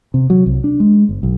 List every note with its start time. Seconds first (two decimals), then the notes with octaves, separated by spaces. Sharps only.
0.14 C3
0.30 F#3
0.46 C2
0.64 D4
0.80 G#3
1.09 G1
1.23 B1